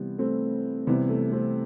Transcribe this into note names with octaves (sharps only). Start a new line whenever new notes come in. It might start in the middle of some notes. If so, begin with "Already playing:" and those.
Already playing: C3 E3 G3 B3
A3 C4
C3 E3 G3 B3
A3
A3 C4